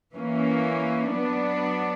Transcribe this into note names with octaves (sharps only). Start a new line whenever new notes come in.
E3 A#3 C#4
F#3 B3 D4